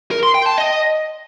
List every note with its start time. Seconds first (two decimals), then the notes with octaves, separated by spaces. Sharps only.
0.11 A#4
0.23 C6
0.35 G5
0.46 A5
0.58 D#5